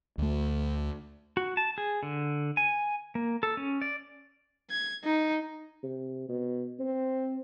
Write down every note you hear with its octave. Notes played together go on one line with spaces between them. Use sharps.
D2 A3
F#4
A5
G#4
D3
G#5
A#3
A4
C#4
D5
G#6
D#4
C3
B2
C4